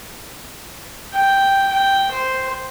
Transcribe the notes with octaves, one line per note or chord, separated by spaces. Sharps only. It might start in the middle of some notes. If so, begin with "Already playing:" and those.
G5
G5
C5